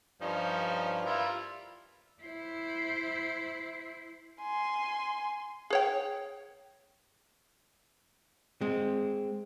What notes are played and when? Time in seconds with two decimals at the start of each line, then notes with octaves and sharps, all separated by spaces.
0.22 G2 F3 C#4 D#4 C5
1.06 G3 E4 F4 A#4
2.23 E4 C5
4.41 G#5 C6
5.70 G#4 C#5 G5
8.61 G#3 C4